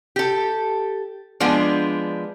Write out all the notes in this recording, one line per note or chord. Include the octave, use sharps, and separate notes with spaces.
G4 A4
F3 G#3 B3 D4